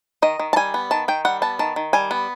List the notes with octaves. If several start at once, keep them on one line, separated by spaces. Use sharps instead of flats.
D#3 D#5
D#3
A5
G3 G#5
B3
D#3 A5
D#3 G5
G3 F#5
B3 A5
D#3 A5
D#3
G3 G#5
B3